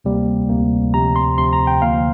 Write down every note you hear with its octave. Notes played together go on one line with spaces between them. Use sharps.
D2 C3 G3 A#3
D2 C3 G3 A#3
D2 C3 F3 A#5
C6
D2 C3 F3 C6
A#5
G5
D2 D3 F3 A#3 F5